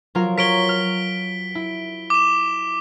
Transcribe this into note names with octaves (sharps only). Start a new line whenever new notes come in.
F#3 F4 A#4
A#4 C#5 B6 D7 G7
F6
E4
D6 E7